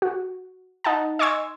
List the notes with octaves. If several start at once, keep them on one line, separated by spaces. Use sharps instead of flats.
F#4
D#4 F#5 A5
D#5 G#5 C6 C#6 E6 G#6